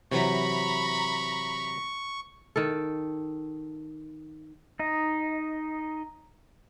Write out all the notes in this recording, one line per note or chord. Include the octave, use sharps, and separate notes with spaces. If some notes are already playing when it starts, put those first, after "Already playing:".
C3 E3 F#3 A#5 B5 C#6
D#3 A4
D#4 D#5